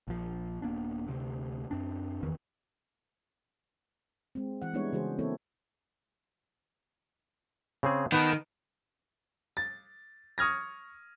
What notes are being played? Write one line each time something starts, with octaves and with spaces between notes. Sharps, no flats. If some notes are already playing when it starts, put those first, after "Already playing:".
A#1 F3
D#1 A#3 B3 D4
D2 C3
F#2 C4 D4
F#1 E2 D#3 E3
G#3 C4
E3 F#5
G3 G#3 B3 D4 E4 C#5
C#3 E3 G#3 F#4 G#4 C5
E3 A#3 C4 E4 A4 C#5
C#3 C4 G#4
D#3 B3 B4 A5
A6
C#6 D#6 F6 G#6 A#6